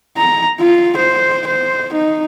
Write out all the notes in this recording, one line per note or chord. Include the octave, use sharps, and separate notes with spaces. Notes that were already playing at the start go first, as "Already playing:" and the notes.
A#5
F4
C5
C5
D#4